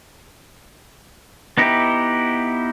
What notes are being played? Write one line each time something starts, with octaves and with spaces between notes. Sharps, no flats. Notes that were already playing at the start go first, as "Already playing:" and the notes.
B3 D#4 E4 G4